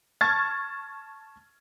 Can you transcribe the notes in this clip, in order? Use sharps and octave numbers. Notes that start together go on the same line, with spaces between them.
A5 C#6 F6 G#6 A6